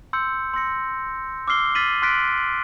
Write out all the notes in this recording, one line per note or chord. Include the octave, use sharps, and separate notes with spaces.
C6 E6 G6 C#7
C6 E6 A#6 C#7
D6 E6 F6 C7 G7
F6 A6 B6 D#7 F#7
C6 F6 F#6 A6 B6 D7